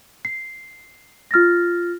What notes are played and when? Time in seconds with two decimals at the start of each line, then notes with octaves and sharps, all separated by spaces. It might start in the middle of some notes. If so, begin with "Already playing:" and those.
0.25 C7
1.31 F4 F6 A6 A#6